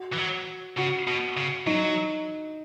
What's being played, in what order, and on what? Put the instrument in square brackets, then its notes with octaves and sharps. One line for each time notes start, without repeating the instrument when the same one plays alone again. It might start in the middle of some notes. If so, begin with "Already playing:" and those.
Already playing: [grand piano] F#4
[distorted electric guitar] E3
F#3
[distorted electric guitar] C#3 [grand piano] F#4
[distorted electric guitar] B2
C#3
[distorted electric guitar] F#3 [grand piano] D#4